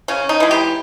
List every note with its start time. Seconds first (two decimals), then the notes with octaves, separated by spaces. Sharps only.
0.08 C#3 C#4
0.29 D#4
0.40 E3 G#3
0.51 G4